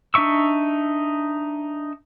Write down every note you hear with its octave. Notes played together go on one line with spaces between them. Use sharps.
D4 D#4 E5 C#6 E6